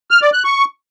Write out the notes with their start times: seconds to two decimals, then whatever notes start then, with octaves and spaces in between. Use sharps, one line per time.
0.11 F6
0.22 D5
0.33 F#6
0.44 C#6